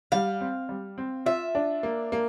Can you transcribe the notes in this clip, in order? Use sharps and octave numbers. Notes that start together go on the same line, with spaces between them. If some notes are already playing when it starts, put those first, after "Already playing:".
G3 F5
C4
G3
C4
F4 E5
D4
A#3
A#3